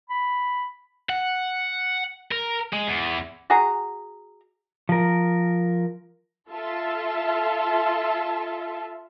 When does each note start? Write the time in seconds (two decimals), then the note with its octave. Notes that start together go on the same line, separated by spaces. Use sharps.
0.10 B5
1.09 F#5
2.32 A#4
2.73 G#3
2.87 E2
3.50 F#4 G#4 A#5
4.89 F3 A#4
6.51 F4 A4 E5 A5